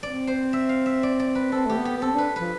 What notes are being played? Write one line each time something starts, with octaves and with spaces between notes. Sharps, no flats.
C4 D5
C5
E5
F5
E5
D5
D5
B4
C4 A4
A3 G4
B3
G4
B3
C4 A4
D4 B4
F3 B4